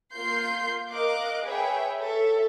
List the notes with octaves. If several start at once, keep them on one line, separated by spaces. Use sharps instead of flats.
A#3 F4 C6 G6 C7
A#4 D#5 F5 D6 F#6
G#4 B4 C#5 E5 G5
A4 C#5 E5